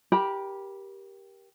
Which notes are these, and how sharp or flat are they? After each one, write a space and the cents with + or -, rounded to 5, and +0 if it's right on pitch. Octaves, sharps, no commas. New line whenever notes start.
G4 +0 A#4 +20 B5 -15